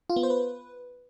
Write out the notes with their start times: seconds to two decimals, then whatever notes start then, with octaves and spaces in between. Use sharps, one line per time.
0.10 F4
0.16 B3
0.23 C5
0.30 B4